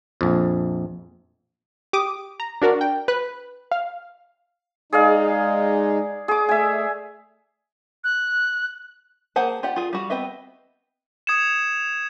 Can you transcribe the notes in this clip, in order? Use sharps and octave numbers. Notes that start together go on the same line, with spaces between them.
A#1 F2
G4 D6 D#6
A#5
D4 F#4 A#4 D5
G5
B4 F#6
F5
G#3 D#4 G#4 D5 F5
G#4 D6
A3 E5 G#5
F#6
A#3 G#4 C5 F#5 A5
F4 G4 D5 F#5
F4 G#4
G3 F#4
B3 C4 B4 D#5 E5
D#6 G#6 C#7 E7